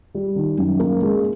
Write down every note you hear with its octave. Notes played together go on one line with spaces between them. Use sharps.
G3
D#3
F#2
A#3
G#3